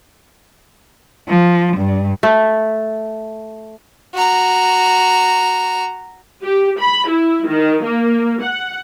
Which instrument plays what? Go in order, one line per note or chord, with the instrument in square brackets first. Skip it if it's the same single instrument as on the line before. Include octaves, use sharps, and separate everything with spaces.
[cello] F3
G2
[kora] A3
[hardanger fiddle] F#4 A#5
[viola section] G4
B5
E4
D#3
A#3
F#5